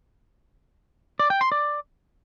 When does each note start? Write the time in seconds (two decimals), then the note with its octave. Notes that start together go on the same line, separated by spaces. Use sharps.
1.19 D5
1.30 G5
1.41 C6
1.52 D5